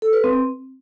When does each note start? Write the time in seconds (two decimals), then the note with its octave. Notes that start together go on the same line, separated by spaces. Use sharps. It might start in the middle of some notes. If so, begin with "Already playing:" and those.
0.02 A4
0.13 B4
0.24 C4